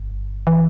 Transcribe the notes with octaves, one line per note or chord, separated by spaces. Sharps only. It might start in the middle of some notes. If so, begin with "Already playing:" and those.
Already playing: G1 G2
E3